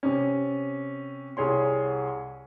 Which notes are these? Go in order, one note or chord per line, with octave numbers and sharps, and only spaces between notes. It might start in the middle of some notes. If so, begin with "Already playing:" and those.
C3 C#4
C2 G#4 C#5 C6